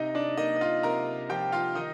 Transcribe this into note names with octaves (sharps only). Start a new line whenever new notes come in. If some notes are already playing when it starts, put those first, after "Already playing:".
Already playing: C3 D#4 D#5
D4 D5
A#3 D#4 D#5
D#5
F4 F5
C3 A#4 A#5
F3 G4 G5
F4 F5
D#3 D#4 D#5